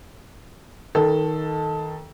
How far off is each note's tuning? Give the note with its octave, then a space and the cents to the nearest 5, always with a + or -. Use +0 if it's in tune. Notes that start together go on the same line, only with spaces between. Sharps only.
D#3 +20 A4 +0